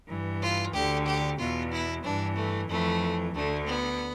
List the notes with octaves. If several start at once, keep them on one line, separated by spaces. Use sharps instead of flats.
G2 E3
F4
D2 D3 G4
G4
E2 B2 F4
E4
G2 E3 D4
A3
F2 E3 A3
D2 D3 A3
B3